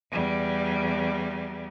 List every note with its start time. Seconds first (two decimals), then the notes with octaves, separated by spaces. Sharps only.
0.11 E2 G3